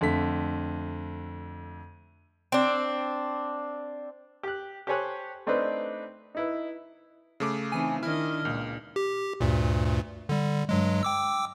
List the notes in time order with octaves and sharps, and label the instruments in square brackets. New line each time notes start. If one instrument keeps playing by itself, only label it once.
[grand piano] F2 D3 A3 B6
[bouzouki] C4 D4
[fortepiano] G4 F#6
G4 A4 C5 C#5 G#5 F#6
A3 C4 D4 D#4 B4 C5
D#4 E4 B4
[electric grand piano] C#3 A3 D6
[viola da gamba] E3 C4 D#4 [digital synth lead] G#5
[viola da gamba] D#3 D4 D#5 [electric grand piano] E4 [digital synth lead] F6
[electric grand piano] C#2 [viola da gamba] A#2
[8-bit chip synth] G4
D2 G2 A#2
D3 G3
G2 F#3 G#3
G5 D6 E6